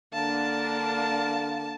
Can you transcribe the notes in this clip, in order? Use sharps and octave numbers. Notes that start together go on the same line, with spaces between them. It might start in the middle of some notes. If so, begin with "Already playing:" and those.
D3 A#3 D4 A#4 F5 A5